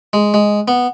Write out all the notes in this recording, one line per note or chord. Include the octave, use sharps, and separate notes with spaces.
G#3
G#3
B3